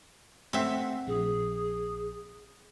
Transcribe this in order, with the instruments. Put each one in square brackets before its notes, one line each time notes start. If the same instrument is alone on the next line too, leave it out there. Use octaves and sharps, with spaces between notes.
[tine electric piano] A3 F#5 [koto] C4 E5
[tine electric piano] A#1 [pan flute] G#4